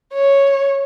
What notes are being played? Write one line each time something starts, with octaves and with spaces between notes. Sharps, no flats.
C#5